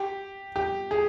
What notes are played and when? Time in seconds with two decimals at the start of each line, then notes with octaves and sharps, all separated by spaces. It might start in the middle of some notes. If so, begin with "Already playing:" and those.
Already playing: G4
0.56 G4
0.91 G#4